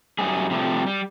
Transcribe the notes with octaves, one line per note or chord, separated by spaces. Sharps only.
F#2 G3 G#4
C3 F3 G3 A3
G3